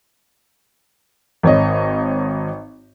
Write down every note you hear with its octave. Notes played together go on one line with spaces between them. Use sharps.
G#1 C#5 D#5